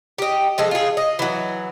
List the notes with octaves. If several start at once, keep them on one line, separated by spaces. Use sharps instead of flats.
G4 D#5
F3 G#3 A4
F4 G#4
D#5
E3 F#3